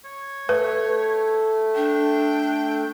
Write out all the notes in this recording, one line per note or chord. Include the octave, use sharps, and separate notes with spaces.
C#5
A3 B4
D4 G5